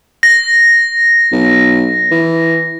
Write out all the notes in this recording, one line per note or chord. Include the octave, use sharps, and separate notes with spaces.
A#6
B1
E3